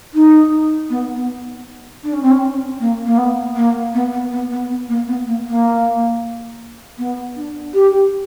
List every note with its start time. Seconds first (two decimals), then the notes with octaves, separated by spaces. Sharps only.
0.14 D#4
0.90 B3
1.15 B3
2.04 D4
2.13 C#4
2.22 C4
2.31 C#4
2.80 A#3
3.06 A#3
3.18 B3
3.56 A#3
3.94 B3
4.12 B3
4.32 B3
4.51 B3
4.70 B3
4.88 A#3
5.07 B3
5.27 A#3
5.46 A#3
6.98 B3
7.36 D4
7.74 G4